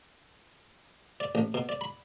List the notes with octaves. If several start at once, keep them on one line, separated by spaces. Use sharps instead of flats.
D5
A1
B2
D5
B5